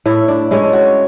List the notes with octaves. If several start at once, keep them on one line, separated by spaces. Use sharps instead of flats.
A2 E4
D4
G#3 C#4 E4
F#4